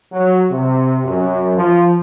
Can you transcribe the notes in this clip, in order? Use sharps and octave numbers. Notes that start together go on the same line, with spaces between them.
F#3
C3
F#2
F3